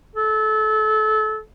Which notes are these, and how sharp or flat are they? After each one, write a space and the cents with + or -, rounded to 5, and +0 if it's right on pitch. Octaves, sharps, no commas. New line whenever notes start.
A4 -25